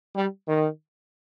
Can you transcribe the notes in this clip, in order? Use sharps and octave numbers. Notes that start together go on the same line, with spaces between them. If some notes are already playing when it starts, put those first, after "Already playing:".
G3
D#3